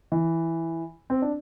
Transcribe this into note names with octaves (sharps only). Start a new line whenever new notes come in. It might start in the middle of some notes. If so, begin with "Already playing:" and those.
E3
C4
D4